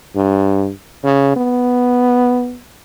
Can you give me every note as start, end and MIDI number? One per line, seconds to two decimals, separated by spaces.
0.16 0.71 43
1.04 1.33 49
1.36 2.59 59